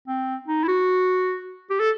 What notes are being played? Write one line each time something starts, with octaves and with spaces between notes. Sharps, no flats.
C4
D#4
E4
F#4
G4
A4